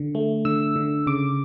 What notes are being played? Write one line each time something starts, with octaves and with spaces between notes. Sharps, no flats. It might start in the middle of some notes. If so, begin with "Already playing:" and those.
Already playing: D3
A3
D3 E6
D3
C#3 D6